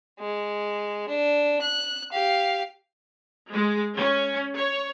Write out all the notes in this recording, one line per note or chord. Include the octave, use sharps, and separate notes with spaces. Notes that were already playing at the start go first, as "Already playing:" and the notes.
G#3
D4
F#6
G4 F5
G#3
C#4
C#5